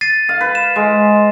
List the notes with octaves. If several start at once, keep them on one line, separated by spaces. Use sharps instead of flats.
A6 C7 D#7
F5
B4
E7
G#3